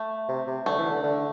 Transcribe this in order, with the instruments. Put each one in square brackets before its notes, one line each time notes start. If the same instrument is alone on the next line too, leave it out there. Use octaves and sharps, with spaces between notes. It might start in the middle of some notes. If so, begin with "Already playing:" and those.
Already playing: [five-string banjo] A3
[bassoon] C3
C3
[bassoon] D3 [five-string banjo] A3
[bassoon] E3
D3
D3